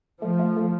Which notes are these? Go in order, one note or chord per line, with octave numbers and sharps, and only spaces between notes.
F3 A3
A3
A3